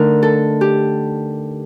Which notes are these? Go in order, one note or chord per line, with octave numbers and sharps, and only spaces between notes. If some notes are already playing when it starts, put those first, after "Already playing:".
Already playing: D3 A3 D#4 A#4
A4
G4